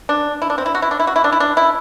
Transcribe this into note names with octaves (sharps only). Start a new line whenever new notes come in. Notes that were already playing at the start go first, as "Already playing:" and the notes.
D4
E4
D4
C4
E4
F#4
E4
D4
E4
F#4
E4
D4
E4
D4
E4